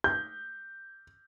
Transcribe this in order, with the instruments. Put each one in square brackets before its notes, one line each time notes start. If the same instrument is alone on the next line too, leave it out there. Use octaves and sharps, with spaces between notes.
[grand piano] G6